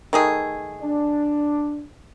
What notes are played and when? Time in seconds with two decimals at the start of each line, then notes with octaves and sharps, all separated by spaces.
0.13 D#3 A3 G#4
0.81 D4